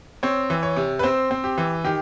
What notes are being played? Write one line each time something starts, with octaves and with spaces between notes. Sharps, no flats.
C4 C#5
E3
C#5
C3
B4
C4 C5
C4
G4
E3
D#3 G4